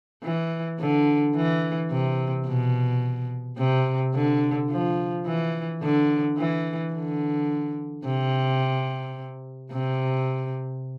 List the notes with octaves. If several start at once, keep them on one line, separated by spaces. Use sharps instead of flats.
E3
D3
E3
C3
B2
C3
D3
F3
E3
D3
E3
D3
C3
C3